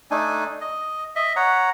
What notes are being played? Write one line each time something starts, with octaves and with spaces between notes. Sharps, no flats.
A3 D4 D#4 G#5
D#5
D#5 E5
C#5 F#5 A#5